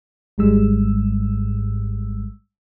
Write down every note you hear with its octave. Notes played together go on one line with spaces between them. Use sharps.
G#1 G#2 G3 G#3 E6